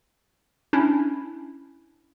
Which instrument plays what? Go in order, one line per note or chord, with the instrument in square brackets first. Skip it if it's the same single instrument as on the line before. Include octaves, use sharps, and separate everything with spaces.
[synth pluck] C#4 D4 E4